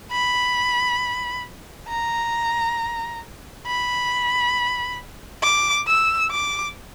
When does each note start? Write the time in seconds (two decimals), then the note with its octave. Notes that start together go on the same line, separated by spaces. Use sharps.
0.12 B5
1.89 A#5
3.67 B5
5.43 D6
5.88 E6
6.31 D6